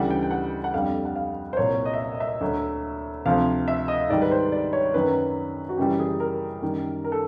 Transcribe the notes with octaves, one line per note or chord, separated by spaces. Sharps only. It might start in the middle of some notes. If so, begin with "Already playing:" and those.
Already playing: D2 C#3 E3 G3 F#5
G5
G5
F#5
F#5
F2 D3 G3 F5
F#5
F5
C5
C2 A#2 F#3 C#5
D#5
E5
D#5
D#5
E5
D2 D3 F#3
D2 C3 F3 F5
E5
D#5
G#2 D#3 G3 D5
B4
C5
D5
C#5
F#2 D#3 F#3 B4
F#4
F#2 C#3 E3 G3 G4
G#4
A#4
F#2 D#3 G3
A#4
A4